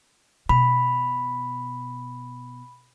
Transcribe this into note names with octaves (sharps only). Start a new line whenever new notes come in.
B2 B5